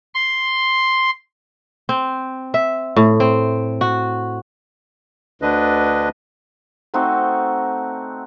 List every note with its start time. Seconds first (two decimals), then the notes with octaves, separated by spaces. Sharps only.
0.14 C6
1.89 C4
2.54 E5
2.96 A2
3.20 C4
3.81 F#4
5.42 D2 D3 D4 B4 D#5
6.94 A3 C4 D#4 F#4